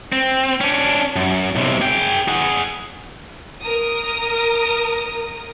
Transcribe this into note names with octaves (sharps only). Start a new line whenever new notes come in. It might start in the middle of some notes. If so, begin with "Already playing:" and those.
C4
C#4 D4
F#2
B1 C3
G#4 G5
G#4 F#5
A#4 D#6